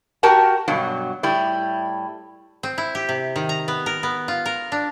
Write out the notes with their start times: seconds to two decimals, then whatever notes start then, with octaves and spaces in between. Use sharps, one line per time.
0.23 F#4 G4 A#4 A5 A#5
0.68 G2 B2 F#3
1.23 A2 G3 E4
2.63 C4
2.78 E4
2.95 G4
3.09 C3
3.36 D#3
3.49 A#5
3.68 B3
3.86 A#4
4.03 B3
4.28 F4
4.46 A#4
4.72 D4